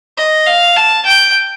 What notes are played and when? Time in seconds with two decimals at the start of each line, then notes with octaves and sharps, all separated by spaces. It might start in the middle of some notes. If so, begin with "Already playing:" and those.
0.17 D#5
0.47 F5
0.76 A5
1.06 G5